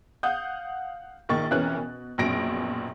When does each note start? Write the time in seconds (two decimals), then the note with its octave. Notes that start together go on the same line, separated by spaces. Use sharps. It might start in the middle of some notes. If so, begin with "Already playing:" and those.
0.23 F5 F#5 D#6 G6
1.29 A#1 D#3 A#3 C#6 A6
1.50 F2 B2 E3 C#4 A#4 F#6
1.75 B2
2.18 A#1 F#2 B2 A#6 D7